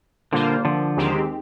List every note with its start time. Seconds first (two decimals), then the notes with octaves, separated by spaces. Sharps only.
0.32 A#2 D3 G3 A#3 F4 C5
0.65 D3 F3
0.97 D#2 D#3 G#3 C4 G4